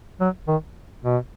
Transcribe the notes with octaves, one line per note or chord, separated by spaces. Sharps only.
F#3
D#3
B2